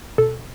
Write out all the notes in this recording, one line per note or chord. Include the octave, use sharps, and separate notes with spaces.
B2 A4